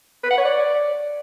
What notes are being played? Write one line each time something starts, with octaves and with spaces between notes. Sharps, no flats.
B4
F#5
C#5
D5